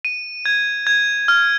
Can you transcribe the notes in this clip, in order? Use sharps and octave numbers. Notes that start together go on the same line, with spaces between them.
D#7
G#6
G#6
F6